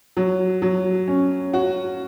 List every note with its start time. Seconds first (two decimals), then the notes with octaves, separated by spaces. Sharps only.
0.17 F#3
0.62 F#3
1.08 C#4
1.53 F#4